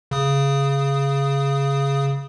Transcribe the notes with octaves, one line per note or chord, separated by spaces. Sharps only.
C#3 D#6